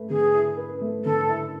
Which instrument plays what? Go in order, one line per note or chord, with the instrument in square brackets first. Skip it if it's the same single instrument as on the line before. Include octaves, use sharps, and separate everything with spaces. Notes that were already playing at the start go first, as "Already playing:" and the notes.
Already playing: [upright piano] A3 B4
[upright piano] D3 [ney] G#4
[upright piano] E4
B4
A3
[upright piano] D3 [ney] A4
[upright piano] E4